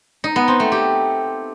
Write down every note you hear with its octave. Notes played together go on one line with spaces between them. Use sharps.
D#4
B3
C4
A3
G4